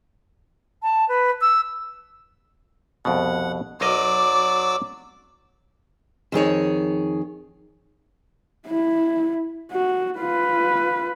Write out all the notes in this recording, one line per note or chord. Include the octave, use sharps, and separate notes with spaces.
A5
B4
E6
C2 F2 B2 F#5
B1 F#3 A#4 D5 D#5 D6 E6
F2 D#3 G#4 C#5
E4
F#4
F4 B4